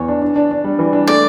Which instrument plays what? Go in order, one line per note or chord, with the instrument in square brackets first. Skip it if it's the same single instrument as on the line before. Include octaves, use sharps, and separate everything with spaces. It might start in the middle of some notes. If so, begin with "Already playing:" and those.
Already playing: [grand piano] E2 [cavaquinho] C#5
[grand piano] D4
D4
D4
D4
G3
E3
D4
[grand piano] A3 [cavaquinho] D5